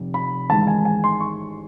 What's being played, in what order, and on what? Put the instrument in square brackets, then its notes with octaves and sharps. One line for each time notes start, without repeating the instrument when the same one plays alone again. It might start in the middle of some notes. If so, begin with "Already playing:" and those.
Already playing: [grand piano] F1
B5
A1 G#2 D#3 G#3 A5
G#5
G#5
C6
C#6